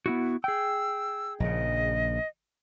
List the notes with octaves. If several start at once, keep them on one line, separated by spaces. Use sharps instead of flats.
B3 E4 F#4
G#4 G5 E6
A#1 C#3 D#5